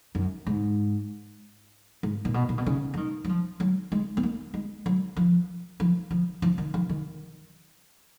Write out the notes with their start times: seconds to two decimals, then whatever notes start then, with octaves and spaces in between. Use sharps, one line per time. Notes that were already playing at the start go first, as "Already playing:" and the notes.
0.15 F#2
0.47 G#2
2.03 G#2
2.25 A#2
2.34 B2
2.49 A#2
2.58 B2
2.66 C#3
2.94 F3
2.97 D#3
3.24 F#3
3.29 F3
3.60 F#3
3.92 G#3
4.17 B3
4.23 A#3
4.54 G#3
4.86 F#3
5.17 F3
5.80 F3
6.11 F3
6.42 F3
6.58 D#3
6.74 F3
6.89 D#3